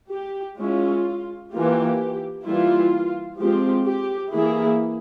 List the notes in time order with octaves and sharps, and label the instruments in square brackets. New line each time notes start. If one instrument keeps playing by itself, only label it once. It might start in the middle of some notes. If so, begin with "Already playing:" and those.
[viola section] G4
G#3 C#4 E4 F4
E3 A#3 F4 G4
E3 G3 A#3 E4 F4
F3 G#3 C4 F4 G4
G4
E3 A#3 E4 G#4